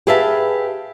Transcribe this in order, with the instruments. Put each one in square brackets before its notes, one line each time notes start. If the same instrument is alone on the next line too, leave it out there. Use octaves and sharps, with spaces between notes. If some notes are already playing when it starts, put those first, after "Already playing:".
[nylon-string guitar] G4 G#4 B4 E5 F5 A5